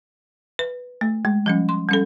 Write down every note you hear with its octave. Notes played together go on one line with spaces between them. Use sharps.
B4
A3
G#3
F3 G3 C#4
C6
G3 C#4 A4